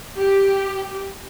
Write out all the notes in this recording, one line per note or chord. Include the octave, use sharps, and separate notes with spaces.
G4